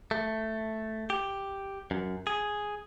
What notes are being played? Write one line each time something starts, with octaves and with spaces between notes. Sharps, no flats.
A3
G4
F#2
G#4